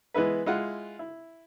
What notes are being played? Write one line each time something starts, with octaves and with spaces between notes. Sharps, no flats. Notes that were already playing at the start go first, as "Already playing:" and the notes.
E3 G#3 B3 E4 B4
G#3 E4 F4 F#5
E4